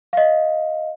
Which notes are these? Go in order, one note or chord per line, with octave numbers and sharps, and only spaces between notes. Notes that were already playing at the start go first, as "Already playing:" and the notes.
D#5 F5